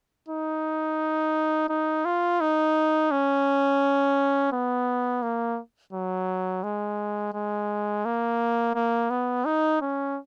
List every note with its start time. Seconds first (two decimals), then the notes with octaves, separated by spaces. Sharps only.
0.28 D#4
1.69 D#4
2.05 F4
2.41 D#4
3.11 C#4
4.52 B3
5.22 A#3
5.93 F#3
6.63 G#3
7.34 G#3
8.05 A#3
8.75 A#3
9.10 B3
9.46 D#4
9.81 C#4